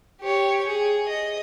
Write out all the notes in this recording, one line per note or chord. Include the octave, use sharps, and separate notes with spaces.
G4 C#5
G#4
D#5